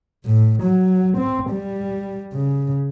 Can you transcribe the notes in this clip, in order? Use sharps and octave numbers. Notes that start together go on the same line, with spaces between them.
A2
F#3
C4
G3
C#3